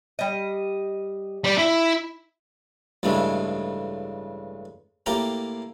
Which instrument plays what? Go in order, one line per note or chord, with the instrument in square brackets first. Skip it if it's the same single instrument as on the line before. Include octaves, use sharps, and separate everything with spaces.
[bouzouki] G3 D#5
[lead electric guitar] G3 D5
E4
[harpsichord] A1 G2 C#3 G#3 A3
A2 A#3 G4 G5 A#5